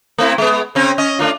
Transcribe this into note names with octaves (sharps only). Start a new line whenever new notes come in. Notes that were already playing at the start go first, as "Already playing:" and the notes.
A3 C4 E4
G#3 B3
C#3 C4 C#4
C#4 D#5
A3 D4 F4